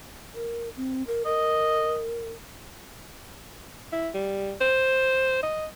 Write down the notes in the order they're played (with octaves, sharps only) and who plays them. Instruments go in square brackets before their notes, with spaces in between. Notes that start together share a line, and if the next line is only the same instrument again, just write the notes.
[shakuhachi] A#4
C4
A#4
[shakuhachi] A#4 [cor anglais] D#5
[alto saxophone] E4
G3
C5
D#5